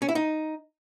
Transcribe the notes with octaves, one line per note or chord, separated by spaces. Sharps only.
C#4
E4
D#4